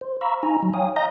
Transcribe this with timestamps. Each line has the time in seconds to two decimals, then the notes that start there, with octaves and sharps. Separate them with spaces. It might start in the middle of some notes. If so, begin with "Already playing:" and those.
0.01 C5
0.21 F5 A#5 B5 C#6 E6
0.43 D#4 G#5 A#5
0.63 F#3
0.74 C#5 F5 G5 G#5 D#6
0.96 D#5 F5 A#5 D#6 G6 A#6